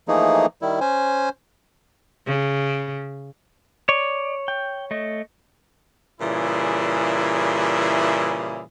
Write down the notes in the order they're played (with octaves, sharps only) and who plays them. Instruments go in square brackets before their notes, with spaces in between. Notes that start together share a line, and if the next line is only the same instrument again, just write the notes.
[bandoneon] E3 F3 A3 A#3 D#4 G#4
D#3 G3 E4
C#4 C5 G#5
[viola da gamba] C#3
[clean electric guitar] C#5 [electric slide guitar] D5
[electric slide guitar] G5
A3 D#5
[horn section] A#2 C#3 E3 G3 E4 G#4